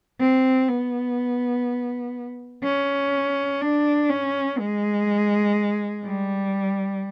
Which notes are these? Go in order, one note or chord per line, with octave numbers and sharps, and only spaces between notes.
C4
B3
C#4
D4
C#4
G#3
G3